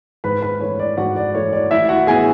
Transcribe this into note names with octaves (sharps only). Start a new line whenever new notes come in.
G#2 B4 B5
B4 B5
E3 A3 C#5
D5
G#2 F#4 F#5
D5
E3 A3 C#5
D5
A1 E4 E5
F#4 F#5
A2 E3 B3 E4 G#4 G#5